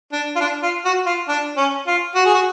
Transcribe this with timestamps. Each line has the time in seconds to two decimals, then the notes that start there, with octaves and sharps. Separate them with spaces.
0.12 D4
0.36 F4
0.41 D4
0.63 F4
0.85 F#4
1.06 F4
1.28 D4
1.57 C#4
1.87 F4
2.15 F#4
2.25 G#4
2.34 F#4